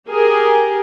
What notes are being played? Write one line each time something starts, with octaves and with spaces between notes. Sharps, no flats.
G4 G#4 A#4